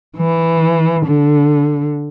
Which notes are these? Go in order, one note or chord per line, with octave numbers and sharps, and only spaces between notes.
E3
D3